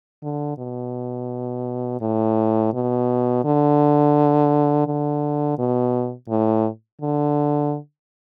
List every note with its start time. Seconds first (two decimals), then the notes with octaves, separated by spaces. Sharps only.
0.23 D3
0.58 B2
2.01 A2
2.74 B2
3.45 D3
4.87 D3
5.58 B2
6.30 A2
7.02 D3